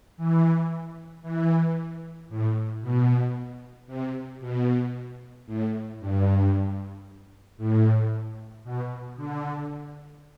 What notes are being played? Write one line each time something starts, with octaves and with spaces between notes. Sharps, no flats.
E3
E3
A2
B2
C3
B2
A2
G2
A2
B2
D3